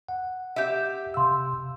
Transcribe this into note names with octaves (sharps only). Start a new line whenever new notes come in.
F#5
G4 E5
C3 F5 C6 E6